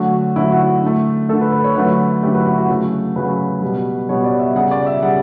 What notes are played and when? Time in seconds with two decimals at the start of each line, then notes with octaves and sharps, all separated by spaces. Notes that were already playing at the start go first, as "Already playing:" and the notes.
Already playing: D3 F#3 A3 F#4
0.36 D3 F#3 A3 E4
0.52 F#4
0.83 D3 A3
1.29 D3 A3 A4
1.41 B4
1.52 B4
1.64 C#5
1.76 D3 F#3 A3 B4
2.23 D3 F#3 A3 G4
2.34 B4
2.40 E4
2.46 F#4
2.58 F#4
2.69 C#3 F#3 A3
3.16 C#3 F#3 A3 B4
3.62 B2 G3
4.09 B2 G3 C#5
4.24 D5
4.39 E5
4.55 C#3 G3 F#5
4.71 D5
4.87 E5
5.02 C#3 G3 F#5